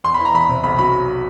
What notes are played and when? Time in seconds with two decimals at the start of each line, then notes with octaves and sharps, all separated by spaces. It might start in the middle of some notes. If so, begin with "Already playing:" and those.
0.04 E2 C6
0.14 E3 B5
0.25 A#5
0.34 E2 B5
0.49 C3
0.63 B1 B5
0.79 F#3 B5